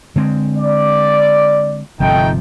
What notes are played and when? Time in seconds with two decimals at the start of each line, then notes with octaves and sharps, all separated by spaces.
0.16 D3 G#3 C4
0.57 D5
2.00 G1 C3 F3 A3 D#4 G5